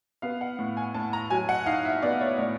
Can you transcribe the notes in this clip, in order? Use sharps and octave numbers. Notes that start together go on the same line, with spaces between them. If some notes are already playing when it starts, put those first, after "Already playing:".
B3 F5
F#5
A2
G#5
A2 A5
A#5
F#3 G#5
F#5
D#4 F5
E5
B3 D5
C#5
A2 D5